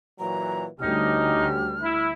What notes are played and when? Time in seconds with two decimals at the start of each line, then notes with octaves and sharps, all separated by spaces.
0.19 A#2 E3 F#3 A#5
0.80 D2 D3 G3 C#4 D#4 F#4 G4 F6
1.82 E4